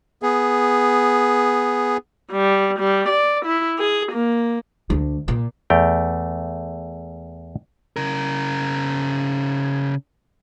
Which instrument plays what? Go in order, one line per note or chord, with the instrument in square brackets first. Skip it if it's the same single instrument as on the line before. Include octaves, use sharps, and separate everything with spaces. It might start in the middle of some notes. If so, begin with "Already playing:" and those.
[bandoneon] B3 G#4
[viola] G3
G3
D5
E4
G#4
A#3
[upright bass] D2
A#2
[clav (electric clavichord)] E2 A3 G5 A#5
[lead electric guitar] C#3 A#4